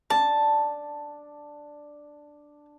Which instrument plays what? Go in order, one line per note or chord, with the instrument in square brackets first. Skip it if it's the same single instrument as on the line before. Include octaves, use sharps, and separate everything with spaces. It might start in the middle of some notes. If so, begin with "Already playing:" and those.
[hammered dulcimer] D4 [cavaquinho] A5